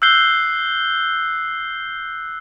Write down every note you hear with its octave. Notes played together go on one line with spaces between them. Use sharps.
E6 F#6 G6 C7 G7